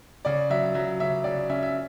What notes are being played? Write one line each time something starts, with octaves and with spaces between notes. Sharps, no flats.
C#3 D5
F#3 E5
F#3 E5
C#3 E5
C#3 D5
C#4 E5
E5